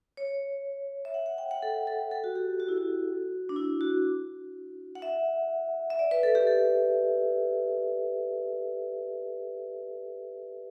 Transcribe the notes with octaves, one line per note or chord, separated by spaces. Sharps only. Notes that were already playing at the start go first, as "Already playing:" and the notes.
C#5
E5
F#5
F#5
G5
F#5
A4
A4
A4
F#4
G4
F#4
E4
F#4
D4
E4
F#4
F#5
E5
E5
D5
B4
A4
G4
A4